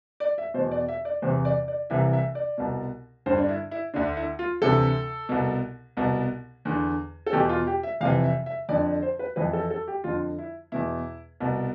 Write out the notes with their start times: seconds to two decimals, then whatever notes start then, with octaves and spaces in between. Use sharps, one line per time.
0.20 D5
0.38 E5
0.54 B2 C5
0.58 E2
0.71 D5
0.88 E5
1.05 D5
1.22 E2 C3 E3 C5
1.45 D5
1.68 D5
1.90 C2 C3 E3 E5
2.13 E5
2.35 D5
2.58 C2 B2
3.26 G2 D3 C5
3.38 D4
3.49 E4
3.71 E4
3.94 D2 D3 D4
4.17 E4
4.39 F4
4.61 D2 C3 E3 A4
5.29 C2 B2
5.97 C2 B2
6.65 E2 D3
7.26 A4
7.33 E2 B2 G4
7.49 F4
7.67 G4
7.83 E5
8.01 F2 C3 E3 F5
8.24 E5
8.46 E5
8.69 F2 D3 D5
8.86 D5
9.02 C5
9.19 B4
9.36 F2 E3 B4
9.53 A4
9.70 A4
9.88 G4
10.04 F2 D3 F4
10.39 E4
10.72 E2 B2 E4
11.40 C2 B2